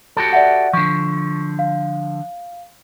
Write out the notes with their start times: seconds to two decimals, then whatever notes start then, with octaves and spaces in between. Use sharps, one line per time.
0.17 F#4 G4 A4
0.33 D5 E5 F#5
0.73 D3 F3 C#6
1.59 F5